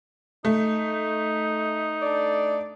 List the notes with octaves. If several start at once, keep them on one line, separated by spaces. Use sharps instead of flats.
A3 D#4
D4 D5